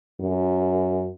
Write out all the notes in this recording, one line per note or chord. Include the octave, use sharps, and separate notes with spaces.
F#2